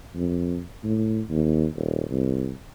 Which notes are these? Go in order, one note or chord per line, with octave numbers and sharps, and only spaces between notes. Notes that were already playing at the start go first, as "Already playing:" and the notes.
F2
A2
D#2
D#1
C2